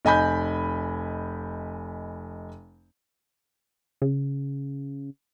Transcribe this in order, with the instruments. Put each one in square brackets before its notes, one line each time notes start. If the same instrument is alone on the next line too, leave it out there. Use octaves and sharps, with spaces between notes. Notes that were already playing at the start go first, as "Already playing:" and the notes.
[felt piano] F1 D#5 G#5 B5 G6
[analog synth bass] C#3